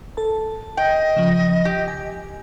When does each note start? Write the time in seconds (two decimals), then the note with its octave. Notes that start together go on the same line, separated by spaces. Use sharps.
0.17 A4 A5
0.77 D#5 G5
1.16 C#3 F3
1.65 G4
1.88 G#5